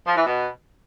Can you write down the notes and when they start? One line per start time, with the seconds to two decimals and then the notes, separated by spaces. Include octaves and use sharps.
0.05 F3
0.16 E3
0.26 B2